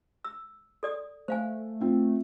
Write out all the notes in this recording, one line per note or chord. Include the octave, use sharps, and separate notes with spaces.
E6
A4 D5 D#6
A3 C5 F5 G#5
C4 F4